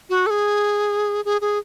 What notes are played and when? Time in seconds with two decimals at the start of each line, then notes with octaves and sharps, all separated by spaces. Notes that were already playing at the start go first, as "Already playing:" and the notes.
0.10 F#4
0.26 A4
0.30 G#4
1.25 G#4
1.41 G#4